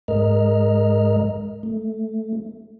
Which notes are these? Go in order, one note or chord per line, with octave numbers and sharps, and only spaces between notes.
G#2 G#3 A#4 D#5 F6
A3